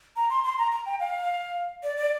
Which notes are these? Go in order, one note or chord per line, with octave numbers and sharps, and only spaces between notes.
A#5
C6
C6
A#5
A#5
G5
F5
D5
D5